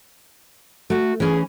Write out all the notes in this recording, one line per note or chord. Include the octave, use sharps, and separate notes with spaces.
A3 F#4
E3 C#4 G#4